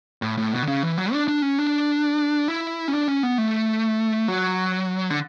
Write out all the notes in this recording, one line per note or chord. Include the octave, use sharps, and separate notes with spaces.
A2
A2
B2
D3
C#3
E3
F#3
D4
D4
C#4
D4
E4
C#4
D4
C#4
B3
A3
F#3
D3